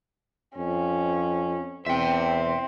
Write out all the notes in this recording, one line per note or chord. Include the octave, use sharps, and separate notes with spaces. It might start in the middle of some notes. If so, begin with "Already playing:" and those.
F2 C#4
E2 C4 E5 G5